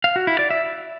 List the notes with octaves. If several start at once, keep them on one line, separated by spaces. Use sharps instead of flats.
F5
F#4
E4
D5
E5